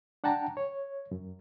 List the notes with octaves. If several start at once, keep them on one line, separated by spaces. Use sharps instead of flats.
D4 F#5 G5 A5 A#5
C#5
F#2